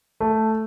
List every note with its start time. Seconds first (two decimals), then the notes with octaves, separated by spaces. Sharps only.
0.20 A3